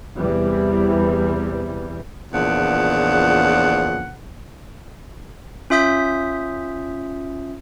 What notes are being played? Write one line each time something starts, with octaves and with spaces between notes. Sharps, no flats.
E2 C3 E3 G3
E2 A#2 C#3 F3 D4 F#5
C#4 F4 E5 D#6 G6 B6